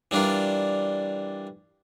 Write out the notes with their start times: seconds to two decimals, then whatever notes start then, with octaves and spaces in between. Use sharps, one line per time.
0.11 E3 G3 D4 F4 A#4